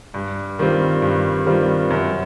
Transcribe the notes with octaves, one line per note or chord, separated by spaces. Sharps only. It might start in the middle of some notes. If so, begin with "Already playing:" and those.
G2
D#3 G3 C4 F4
G2
D#3 G3 C4 F4
F#2